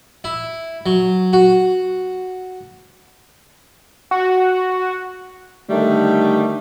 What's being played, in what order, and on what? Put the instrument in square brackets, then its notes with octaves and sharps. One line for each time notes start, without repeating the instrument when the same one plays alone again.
[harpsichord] E4
F#3
F#4
[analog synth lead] F#4
[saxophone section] D3 D#3 G3 A3